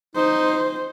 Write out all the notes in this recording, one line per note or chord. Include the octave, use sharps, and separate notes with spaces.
D#4 C5